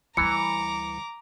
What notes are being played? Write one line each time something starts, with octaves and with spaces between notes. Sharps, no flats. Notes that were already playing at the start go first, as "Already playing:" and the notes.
D2 E3 G3 A#5 D6 C#7